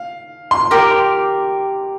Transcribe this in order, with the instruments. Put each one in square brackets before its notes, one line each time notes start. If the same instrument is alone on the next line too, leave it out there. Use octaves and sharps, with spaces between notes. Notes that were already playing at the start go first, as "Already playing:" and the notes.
Already playing: [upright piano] F5
C6
[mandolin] G4 A#4 G5 [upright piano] D6
[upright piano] C6